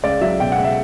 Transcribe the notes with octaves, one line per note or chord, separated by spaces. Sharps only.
C#2 D5
F#3 E5
B2 G5
F#5
C#2
E5